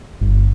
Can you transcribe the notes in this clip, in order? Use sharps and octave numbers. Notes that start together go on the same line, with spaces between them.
G1